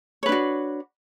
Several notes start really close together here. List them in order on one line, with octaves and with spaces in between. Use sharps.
C#5 B4 D4 F#4